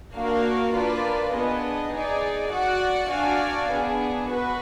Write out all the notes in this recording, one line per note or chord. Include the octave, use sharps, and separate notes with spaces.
A#3 D4 F#4 A#4 F5
A#3 D4 F4 B4 D5
B3 D4 G#4 D#5
D#4 G#4 D5
F#4 D5 F#5
D4 F#4 D5 F5 G#5
B3 D4 G#4
F#4 B4